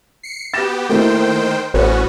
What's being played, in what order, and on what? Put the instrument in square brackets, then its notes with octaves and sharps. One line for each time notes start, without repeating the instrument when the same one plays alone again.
[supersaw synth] C7 C#7
[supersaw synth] B3 G4 [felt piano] A6 A#6 E7
[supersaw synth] D#3 C5 G5 [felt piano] A3 A#3 E4
[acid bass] A1 [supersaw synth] B3 C#4 F#4 [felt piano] C5